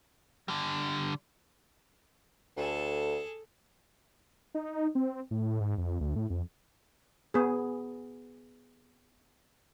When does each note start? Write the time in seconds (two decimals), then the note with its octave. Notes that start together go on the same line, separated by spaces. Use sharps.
0.48 D3 G3
2.57 D2 G#4 A4
4.55 D#4
4.95 C4
5.31 A2
5.60 G#2
5.78 F2
6.01 D2
6.16 A2
6.30 F2
7.34 B3 G#4